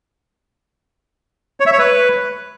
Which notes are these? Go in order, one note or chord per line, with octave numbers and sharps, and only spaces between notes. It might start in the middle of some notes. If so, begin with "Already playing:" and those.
C#5
E5
C#5
B4